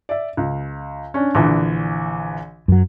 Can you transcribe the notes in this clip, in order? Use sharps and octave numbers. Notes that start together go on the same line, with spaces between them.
D5 E5
C#2
C#4 D4
A#1 D3 E3
F#2 F#3